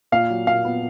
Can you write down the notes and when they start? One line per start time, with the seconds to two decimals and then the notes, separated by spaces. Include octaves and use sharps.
0.12 A#2 F5
0.30 F#3
0.47 A#2 F5
0.65 B3